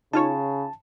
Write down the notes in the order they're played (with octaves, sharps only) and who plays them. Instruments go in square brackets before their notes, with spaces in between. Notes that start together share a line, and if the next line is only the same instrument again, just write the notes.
[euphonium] C#3 [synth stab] D#4 F4 C#5 [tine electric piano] A5